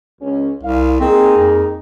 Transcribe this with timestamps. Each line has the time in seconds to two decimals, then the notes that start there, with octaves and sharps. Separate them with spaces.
0.21 C#2 C#4
0.63 C2 F5
1.00 A#3 C4 D#4 G#4
1.38 F2